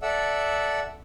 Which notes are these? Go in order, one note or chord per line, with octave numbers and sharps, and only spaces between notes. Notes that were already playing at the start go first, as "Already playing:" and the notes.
A4 D5 E5 F#5 E6